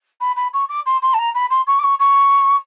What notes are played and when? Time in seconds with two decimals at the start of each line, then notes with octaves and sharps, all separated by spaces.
0.21 B5
0.36 B5
0.53 C#6
0.69 D6
0.86 C6
1.02 C6
1.14 A5
1.18 A#5
1.35 B5
1.50 C6
1.67 C#6
1.79 D6
1.83 C#6
1.99 C#6